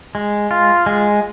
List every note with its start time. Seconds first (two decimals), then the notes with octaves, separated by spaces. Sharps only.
0.15 G#3
0.51 F4
0.86 G#3